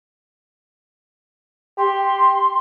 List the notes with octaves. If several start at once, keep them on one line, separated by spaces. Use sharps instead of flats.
G4 C6